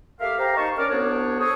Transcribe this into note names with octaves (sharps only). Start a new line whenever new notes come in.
A3 G4 A#4 E5 F5
G4 C5 F5 A#5
A#3 D#4 D#5 A5 C#6
C#4 A#4 D5 F6
C2 B3 D4 C5 C#5
A4 C5 C#5 D#6